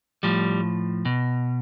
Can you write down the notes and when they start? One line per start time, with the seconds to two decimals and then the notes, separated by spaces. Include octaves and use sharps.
0.23 A2 F3 G3
1.05 B2